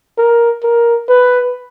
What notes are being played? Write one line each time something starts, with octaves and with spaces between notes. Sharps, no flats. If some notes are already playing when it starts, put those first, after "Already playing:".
A#4
A#4
B4